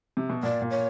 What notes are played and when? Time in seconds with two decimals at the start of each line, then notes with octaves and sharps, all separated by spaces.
0.17 C3
0.30 B2
0.43 A#2 D5
0.62 A#2
0.70 C#5